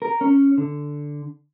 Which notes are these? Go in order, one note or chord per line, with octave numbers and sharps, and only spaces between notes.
A#4
C#4
D3